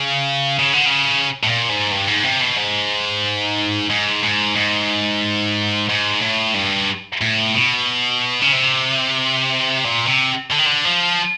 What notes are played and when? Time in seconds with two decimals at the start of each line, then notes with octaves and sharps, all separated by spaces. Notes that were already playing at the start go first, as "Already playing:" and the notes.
Already playing: C#3
0.59 C#3
0.73 D3
0.86 C#3
1.43 A2
1.47 A#2
1.69 G#2
1.91 G2
2.08 G#2
2.24 C3
2.41 B2
2.57 G#2
3.90 G#2
4.23 G#2
4.56 G#2
5.89 G#2
6.21 A2
6.54 G2
7.21 A2
7.54 B2
8.42 C#3
8.53 C3
9.85 A#2
10.07 C3
10.52 D3
10.59 D#3
10.66 D3
10.85 F3